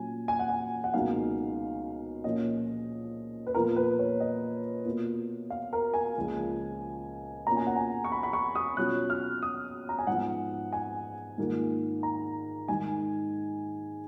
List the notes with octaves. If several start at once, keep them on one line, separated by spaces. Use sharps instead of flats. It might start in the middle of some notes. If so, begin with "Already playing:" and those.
Already playing: A#2 F#3 C#4 F4 G#5
G#5
F#5
G#5
F#5
C#2 B2 F#3 A#3 D#4 F5
A#2 F3 A#3 C#4 F4 D#5
B4
A#2 F3 B3 F4 A#4
B4
C#5
D#5
B2 A#3 F4
F5
A#4
G#5
C#2 C#3 F3 A#3
B2 A#3 C#4 F4 A#5
G#5
F#5
G#5
C#6
B5
B5
C#6
D#6
B2 F#3 C#4 F4 F#6
F6
D#6
A#5
G#5
G#2 F3 B3 F#5
G#5
G#2 D#3 A#3 F4
A#5
G#2 D#3 G#3 G#5